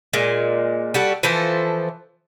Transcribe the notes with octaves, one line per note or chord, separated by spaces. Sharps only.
A#2 G#3
G3 F#4 A4
E3 F3 A4 C5